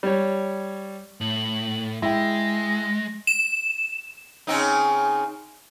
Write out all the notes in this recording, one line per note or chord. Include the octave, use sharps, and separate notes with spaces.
G3 C#5
A2 F#7
G#3 E4 G5 A#6
E7
C#3 C4 D#4